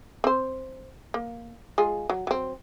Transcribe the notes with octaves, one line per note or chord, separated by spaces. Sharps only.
C4 C5
A#3
G#3 F4 G#4
F#3
F#3 C4